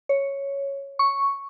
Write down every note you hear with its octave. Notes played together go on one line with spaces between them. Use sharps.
C#5
C#6